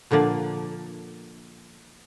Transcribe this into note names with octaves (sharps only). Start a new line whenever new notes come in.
A#2 D3 F3 A#3 D5